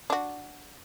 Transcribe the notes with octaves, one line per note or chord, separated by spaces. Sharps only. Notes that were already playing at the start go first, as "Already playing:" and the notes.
D4 F#4